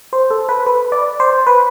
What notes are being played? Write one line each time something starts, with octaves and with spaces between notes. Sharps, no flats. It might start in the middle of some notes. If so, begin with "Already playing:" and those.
C5
A4
B4
B4
D5
C5
B4